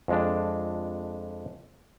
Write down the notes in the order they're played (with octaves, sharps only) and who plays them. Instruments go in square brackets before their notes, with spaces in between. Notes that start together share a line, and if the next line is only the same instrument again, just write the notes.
[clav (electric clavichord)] F2 G#3 D4